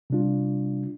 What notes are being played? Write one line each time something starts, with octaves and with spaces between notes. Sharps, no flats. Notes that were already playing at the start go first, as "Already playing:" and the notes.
C3 G3 D4 F4